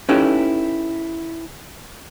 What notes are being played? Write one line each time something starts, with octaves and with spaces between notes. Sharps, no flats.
C#4 D#4 E4 G4 A4 B4